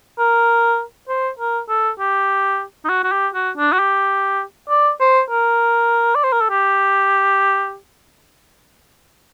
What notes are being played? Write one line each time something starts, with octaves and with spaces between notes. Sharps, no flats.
A#4
C5
A#4
A4
G4
D#4
F#4
F#4
G4
F#4
D4
F#4
G4
D5
C5
A#4
D5
C5
A#4
A4
G4